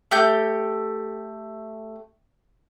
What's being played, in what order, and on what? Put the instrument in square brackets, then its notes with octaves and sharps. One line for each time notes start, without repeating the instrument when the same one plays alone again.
[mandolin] A3 G4 G6